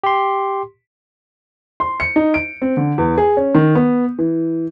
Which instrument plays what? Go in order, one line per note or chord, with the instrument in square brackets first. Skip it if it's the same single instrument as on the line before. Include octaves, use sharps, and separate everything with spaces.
[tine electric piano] G4 C6
[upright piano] C6
C#7
D#4
D7
C4
D3
E2
G#4
C#4
D#3
B3
E3